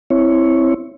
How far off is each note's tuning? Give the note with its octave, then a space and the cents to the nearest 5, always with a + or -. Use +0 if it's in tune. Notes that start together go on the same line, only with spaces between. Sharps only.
C4 +0 E4 +0 C#5 +0